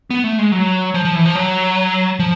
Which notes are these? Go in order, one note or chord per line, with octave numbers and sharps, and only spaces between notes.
B3
A3
G#3
F#3
F3
F3
E3
F3
F#3
F3